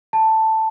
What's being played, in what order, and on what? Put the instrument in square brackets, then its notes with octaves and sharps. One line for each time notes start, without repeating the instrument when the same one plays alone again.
[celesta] A5